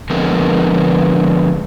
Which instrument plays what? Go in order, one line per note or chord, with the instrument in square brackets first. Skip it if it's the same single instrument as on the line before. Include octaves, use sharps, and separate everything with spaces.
[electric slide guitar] D3 F3 G#3 B3 C4 A#4